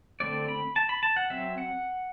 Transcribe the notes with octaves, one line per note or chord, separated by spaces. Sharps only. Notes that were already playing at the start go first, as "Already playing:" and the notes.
D3 A3 C4 D5
B5
A5
B5
A5
F#5
F#3 C4 E5
F#5